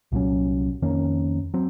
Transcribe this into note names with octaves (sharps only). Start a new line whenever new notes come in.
C2 A#2 F#3 C#4
F2 D#3 A#3 C#4
F#3 C4